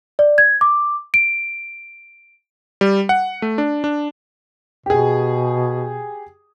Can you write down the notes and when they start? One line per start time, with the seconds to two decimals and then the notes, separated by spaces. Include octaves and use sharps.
0.19 D5
0.38 G#6
0.61 D6
1.14 D7
2.81 G3
3.09 F#5
3.42 A3
3.58 D4
3.84 D4
4.86 B2 G4 G#4